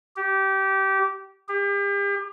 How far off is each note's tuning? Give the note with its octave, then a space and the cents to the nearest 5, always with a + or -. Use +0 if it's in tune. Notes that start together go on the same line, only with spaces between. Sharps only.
G4 -20
G4 +40